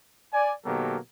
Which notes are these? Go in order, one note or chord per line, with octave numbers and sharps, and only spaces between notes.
D5 G#5
B2 D#3 F#3 A#3 G4 A4